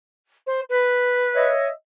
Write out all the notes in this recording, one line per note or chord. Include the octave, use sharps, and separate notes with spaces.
C5
B4
C#5 D#5 E5